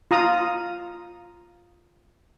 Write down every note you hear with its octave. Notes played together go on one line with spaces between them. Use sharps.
F4 A#5 D#6